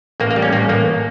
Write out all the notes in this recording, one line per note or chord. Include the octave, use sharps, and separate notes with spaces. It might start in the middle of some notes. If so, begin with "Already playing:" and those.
A1 A#3
A#3
G3
C#4
A1 A#3
A1 A#3